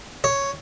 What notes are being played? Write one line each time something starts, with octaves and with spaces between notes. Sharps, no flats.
C#5